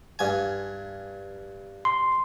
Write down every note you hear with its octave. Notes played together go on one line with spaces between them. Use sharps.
G2 G#5
C6